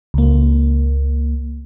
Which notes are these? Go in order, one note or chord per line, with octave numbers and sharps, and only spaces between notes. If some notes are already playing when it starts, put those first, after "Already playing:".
C#2 A#3